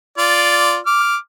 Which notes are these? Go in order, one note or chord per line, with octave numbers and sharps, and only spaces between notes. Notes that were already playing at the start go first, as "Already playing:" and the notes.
F4 D5
D6 F6